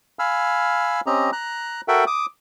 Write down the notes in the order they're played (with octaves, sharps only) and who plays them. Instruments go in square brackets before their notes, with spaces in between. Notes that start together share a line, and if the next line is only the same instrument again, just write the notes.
[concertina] F5 G#5 B5 E6 F6
C4 C#4 G4 D#5 A#5
A#5 F#6
F#4 A4 A#4 E5 F#5 G5
D6 D#6